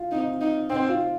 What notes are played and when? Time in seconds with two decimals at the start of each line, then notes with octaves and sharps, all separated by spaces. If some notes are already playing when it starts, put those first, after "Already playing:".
Already playing: F4
0.11 C4 D#4
0.41 D#4
0.69 C4 D#4
0.89 F4